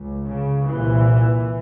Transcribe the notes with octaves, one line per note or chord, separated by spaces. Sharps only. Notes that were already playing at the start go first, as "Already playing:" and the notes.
Already playing: C#2
C#3
C2 A#2 E3